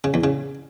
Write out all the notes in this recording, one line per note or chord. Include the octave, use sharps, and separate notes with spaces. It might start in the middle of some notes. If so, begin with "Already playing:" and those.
C#3
E2
C#3